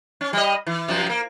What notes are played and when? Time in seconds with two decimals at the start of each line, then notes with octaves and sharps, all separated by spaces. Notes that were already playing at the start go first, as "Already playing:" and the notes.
0.21 C#4
0.33 G3 D#5
0.67 E3
0.88 F#2 C3 F3
1.10 A#3